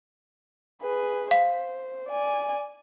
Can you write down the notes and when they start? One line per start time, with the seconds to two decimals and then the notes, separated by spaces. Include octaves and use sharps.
0.82 G#4 B4
1.31 C5 F5
2.09 D5 G#5